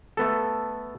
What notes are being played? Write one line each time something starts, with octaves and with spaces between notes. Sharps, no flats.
A3 B3 A4